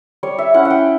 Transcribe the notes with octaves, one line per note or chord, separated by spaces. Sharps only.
G3 C#5
E5
C#4 E4 F#5
F#5
G5